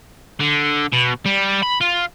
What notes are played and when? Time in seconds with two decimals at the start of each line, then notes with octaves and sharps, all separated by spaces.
0.40 D3
0.93 B2
1.26 G3
1.62 B5
1.81 F4